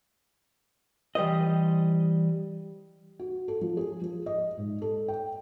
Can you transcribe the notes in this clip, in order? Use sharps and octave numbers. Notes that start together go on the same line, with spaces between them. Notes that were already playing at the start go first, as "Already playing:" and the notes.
E3 G3 C5 D#5
F#4
A4
F3
G#4
F3
D#5
G#2
A4
G5